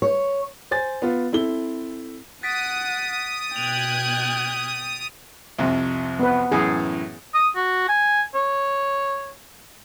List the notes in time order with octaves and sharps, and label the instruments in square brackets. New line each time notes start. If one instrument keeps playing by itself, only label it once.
[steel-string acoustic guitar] C#5
[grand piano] C5 G#5 A6
B3 F4
C4 E4 A4 G7
[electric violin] F#5 [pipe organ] D#6 [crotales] A6 B6 D7
[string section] B2 F#6 G#6 [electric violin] G5 [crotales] D7 F7
[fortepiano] C2 F2 C3
[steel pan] B3 B4
[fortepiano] F#2 A2 E3 [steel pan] G#4
[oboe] D#6
F#4
G#5
C#5